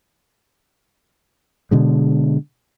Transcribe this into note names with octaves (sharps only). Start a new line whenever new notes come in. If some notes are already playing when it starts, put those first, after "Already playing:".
B2 D3 G#3